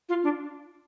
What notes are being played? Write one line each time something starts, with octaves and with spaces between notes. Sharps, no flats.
F4
D4